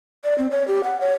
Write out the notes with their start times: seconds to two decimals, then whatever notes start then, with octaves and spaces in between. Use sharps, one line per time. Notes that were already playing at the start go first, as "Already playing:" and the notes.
0.24 D5
0.38 C4
0.51 C#5
0.68 G4
0.84 F#5
1.01 C#5